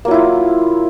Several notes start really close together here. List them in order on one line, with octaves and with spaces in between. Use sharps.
A#3 F#3 E4 F4